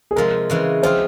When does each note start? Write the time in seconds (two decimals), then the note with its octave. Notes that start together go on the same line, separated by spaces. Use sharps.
0.11 G#4
0.16 C3 F3 G#3 A#4
0.50 C#3 E3 G#3
0.83 F3 C4 F4 C5